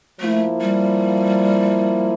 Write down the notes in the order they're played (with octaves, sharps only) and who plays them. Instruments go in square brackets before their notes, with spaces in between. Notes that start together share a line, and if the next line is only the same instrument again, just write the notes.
[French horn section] F3 A#3 E4 [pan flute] A3
[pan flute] G3